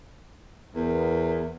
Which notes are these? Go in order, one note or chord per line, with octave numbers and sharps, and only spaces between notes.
E2 B3 A#4